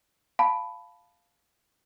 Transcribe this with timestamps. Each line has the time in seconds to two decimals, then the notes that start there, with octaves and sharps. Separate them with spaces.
0.39 F5 A5 B5